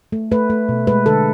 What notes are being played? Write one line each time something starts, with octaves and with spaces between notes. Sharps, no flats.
A3
A3 B4
A3
B2
G#3 B4
D3 A4